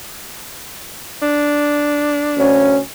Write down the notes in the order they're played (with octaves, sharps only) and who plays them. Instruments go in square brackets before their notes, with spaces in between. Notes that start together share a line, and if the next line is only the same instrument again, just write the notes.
[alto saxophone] D4
[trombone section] D2 C#4